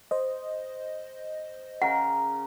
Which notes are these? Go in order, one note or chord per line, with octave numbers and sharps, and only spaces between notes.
C5 D#5
C#3 A#4 F#5